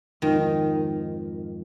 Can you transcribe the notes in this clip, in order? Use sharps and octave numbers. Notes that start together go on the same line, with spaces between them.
F2 G#2 D#3 F3